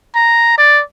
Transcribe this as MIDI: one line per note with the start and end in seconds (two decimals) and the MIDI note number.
0.15 0.58 82
0.58 0.82 74